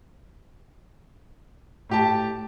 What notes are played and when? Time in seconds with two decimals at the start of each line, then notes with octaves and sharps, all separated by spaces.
1.89 A2 G4 A5